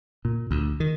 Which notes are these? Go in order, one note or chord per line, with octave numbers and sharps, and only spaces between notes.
A#2
D2
D#3